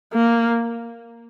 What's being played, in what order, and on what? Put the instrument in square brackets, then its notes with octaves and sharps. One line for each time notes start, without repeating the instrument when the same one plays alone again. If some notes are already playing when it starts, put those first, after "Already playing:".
[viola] A#3